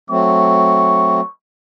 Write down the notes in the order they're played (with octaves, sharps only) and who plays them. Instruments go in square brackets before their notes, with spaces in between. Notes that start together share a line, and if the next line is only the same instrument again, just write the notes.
[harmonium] F#3 A3 C4 [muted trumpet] C#6